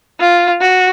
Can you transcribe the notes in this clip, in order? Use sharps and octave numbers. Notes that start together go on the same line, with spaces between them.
F4
F#4